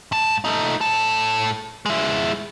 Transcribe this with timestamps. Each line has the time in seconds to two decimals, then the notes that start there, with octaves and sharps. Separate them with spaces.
0.12 G#2 A5
0.44 A3 D#4
0.81 A2 A4
1.86 G#3 E4